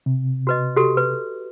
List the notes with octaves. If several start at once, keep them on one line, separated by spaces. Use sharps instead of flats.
C3
F#4 B4 D#5
F#4 G4 A4
B4